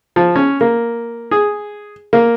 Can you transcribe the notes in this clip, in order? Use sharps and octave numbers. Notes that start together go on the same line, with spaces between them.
F3
C#4
A#3
G#4
A#3